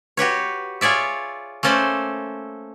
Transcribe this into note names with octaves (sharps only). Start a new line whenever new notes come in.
F#4 G4 B4 C#5
F4 G#4 C#5 D5 E5
A3 A#3 C#4 A4 C5 D5